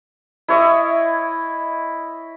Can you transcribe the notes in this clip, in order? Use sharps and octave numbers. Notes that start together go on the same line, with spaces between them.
E4 C#5 D#5